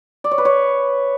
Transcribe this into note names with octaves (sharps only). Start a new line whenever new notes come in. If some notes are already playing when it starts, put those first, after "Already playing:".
D5
C#5
B4
C#5